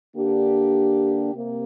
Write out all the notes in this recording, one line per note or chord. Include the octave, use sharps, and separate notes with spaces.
D3 A#3 D4 G4
C3 A#3